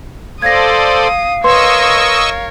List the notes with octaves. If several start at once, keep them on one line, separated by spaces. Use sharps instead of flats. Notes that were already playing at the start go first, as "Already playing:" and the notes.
A4 C5 D5 F5 D#6 G#6 A#6
A#4 B4 C#5 D#5 C6 C#6 E6